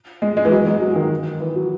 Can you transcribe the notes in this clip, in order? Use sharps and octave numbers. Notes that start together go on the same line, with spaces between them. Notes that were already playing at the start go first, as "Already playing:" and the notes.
G#3
G#3
E3
F#3
G#3
F#3
D#3
E3
F#3